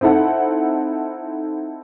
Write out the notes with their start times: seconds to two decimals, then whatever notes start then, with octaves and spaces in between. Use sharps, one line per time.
0.01 C4 D#4 E4 A4 F#5